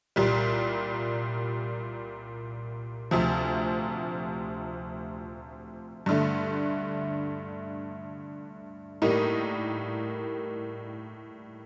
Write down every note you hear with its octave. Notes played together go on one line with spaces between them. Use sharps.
C2 A#2 G3
D2 C3 F3
G2 D3 A3
A2 G3 A#3 D#4